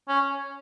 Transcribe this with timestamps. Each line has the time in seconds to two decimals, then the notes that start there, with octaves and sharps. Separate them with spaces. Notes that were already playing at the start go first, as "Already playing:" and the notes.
0.08 C#4